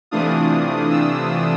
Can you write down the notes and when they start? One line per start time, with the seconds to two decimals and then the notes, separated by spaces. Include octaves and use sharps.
0.11 C3 E3 A3 D4 F4 D#6
0.90 E6